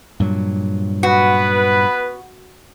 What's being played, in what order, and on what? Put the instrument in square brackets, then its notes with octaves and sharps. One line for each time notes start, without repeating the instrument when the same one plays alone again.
[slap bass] G2 A#2 F#3
[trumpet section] B3 B4 [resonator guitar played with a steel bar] F#4